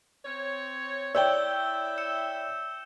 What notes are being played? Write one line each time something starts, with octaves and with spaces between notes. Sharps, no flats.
C4 C#5
E4 C#5 D5 E5 G5 E6 G6 G7
E6 C#7 E7